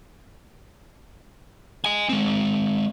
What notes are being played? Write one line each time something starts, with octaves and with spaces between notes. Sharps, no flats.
D#5 G#5
G#3 C4